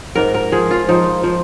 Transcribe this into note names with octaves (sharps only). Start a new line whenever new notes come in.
G#2 A#4
A#4
F3 G#4
F4
F3 D#4
F3